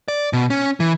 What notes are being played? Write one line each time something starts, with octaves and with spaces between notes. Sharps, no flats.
D5
B2
C#4
E3